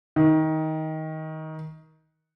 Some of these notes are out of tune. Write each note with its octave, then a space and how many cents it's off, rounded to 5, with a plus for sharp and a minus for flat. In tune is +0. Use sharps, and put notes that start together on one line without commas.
D#3 +20